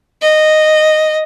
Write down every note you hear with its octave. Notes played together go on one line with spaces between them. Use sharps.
D#5